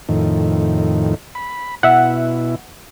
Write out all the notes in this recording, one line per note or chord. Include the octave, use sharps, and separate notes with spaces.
F2 A2 D#3
B5
B2 E4 E5 F#5